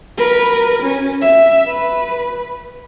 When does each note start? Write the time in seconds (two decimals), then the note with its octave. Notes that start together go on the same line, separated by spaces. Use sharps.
0.18 A#4 B4
0.82 C#4
1.22 E5
1.67 B4